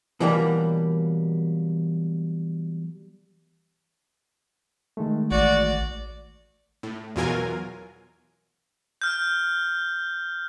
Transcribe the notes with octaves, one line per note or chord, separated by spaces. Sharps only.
B2 E3 F#3 G3 A3 A#3
D#3 G#3 A3
A1 F#4 D5
A2
E2 B2 F#3 F4 A#4 G#5
F6 G6